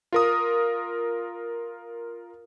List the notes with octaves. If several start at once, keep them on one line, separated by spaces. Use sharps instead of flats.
F4 A#4 D#6